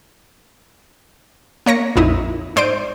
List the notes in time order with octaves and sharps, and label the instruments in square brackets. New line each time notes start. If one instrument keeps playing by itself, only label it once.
[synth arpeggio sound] A#3 C#5 A#6 C#7
A#1 F2 D#4 E4 D#6
G#2 C5 D5 D7 D#7